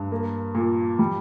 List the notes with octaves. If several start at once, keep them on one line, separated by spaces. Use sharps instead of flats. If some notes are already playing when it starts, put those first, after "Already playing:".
Already playing: G2
A#3
A#2
G3